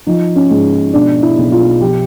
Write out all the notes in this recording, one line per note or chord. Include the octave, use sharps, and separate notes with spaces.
F3 D#4
C#4
G#2
B2 D4
E4
B1
F4
F3 G4